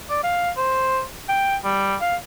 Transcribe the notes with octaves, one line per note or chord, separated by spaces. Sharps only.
D5
F5
C5
G5
G3
F5